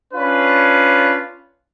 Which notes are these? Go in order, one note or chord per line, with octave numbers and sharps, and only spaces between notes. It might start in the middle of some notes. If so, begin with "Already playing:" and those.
C#4 D4 F4 B4